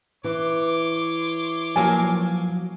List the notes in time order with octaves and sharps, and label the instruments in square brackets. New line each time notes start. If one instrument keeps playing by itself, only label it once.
[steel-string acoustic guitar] E3 [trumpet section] C#5 C6 D6
[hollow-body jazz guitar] F3 F#3 A#3 [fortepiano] G#5